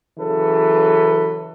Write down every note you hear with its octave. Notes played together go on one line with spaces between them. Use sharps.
C#3 E3 F#3 A4 B4